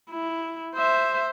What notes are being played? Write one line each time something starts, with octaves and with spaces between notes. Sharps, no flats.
E4
C5 E5